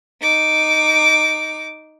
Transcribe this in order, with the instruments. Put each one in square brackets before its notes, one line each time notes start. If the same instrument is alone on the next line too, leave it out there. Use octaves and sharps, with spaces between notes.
[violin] D#4 D6